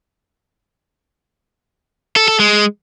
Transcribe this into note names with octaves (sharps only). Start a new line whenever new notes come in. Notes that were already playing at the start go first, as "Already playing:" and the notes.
A4
A4
G#3